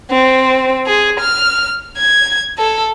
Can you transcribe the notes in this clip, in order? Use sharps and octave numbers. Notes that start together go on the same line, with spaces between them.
C4
G#4
F6
G#6
A4